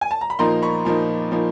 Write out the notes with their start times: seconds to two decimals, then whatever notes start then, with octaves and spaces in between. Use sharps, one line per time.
0.01 G#5
0.11 A5
0.21 A#5
0.30 B5
0.39 A#2 F3 A#3 D#4 A#5 C6
0.62 B5 C#6
0.85 A#2 F3 A#3 D#4
1.31 A#2 F3 A#3 D#4